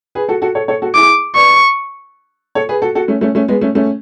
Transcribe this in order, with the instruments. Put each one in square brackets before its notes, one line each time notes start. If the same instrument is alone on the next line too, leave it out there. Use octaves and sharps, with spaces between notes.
[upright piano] G#4 B4
F#4 A4
F#4 A4
A4 C#5
A4 C#5
F#4 A4
[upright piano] E4 G#4 [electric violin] D6
[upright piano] B4 D5 [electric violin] C#6
[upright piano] A4 C#5
G#4 B4
F#4 A4
F#4 A4
A3 C#4
A3 C#4
A3 C#4
G#3 B3
A3 C#4
A3 C#4